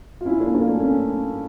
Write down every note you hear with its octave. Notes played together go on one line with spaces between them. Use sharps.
F4
C#4 E4
A#3 D4
C#4
A#3 D4
A3 C#4
C#4